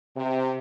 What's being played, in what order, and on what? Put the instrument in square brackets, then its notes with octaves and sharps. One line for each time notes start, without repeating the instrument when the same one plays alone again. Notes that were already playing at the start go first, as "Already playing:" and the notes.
[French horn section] C3